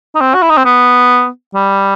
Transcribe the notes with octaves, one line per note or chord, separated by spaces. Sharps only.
D#4
C4
F#4
E4
D#4
C4
B3
G3